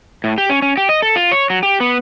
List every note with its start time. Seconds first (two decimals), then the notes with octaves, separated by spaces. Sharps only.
0.24 A2
0.38 G4
0.50 C#4
0.62 C#4
0.77 G4
0.89 D#5
1.02 A4
1.16 F4
1.31 C#5
1.50 F#3
1.63 G4
1.80 B3